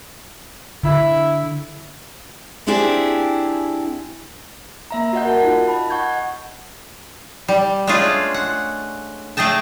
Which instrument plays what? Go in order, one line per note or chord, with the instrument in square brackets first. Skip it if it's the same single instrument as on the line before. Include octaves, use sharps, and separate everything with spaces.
[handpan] D3 [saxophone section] E4
[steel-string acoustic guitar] C4 D4 E4 G4 G#4
[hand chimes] A#3 E5 A#5
F#4 D#5 F#5 G6
A#4 F#5 A5
D#4 F4 D#5
D#5 A5 B5
F#5 C#6 G6 G#6
[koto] G3
G#3 A3 C#4 D4 F4 G#4
F#5
A3 G#4 D#5 G5 A5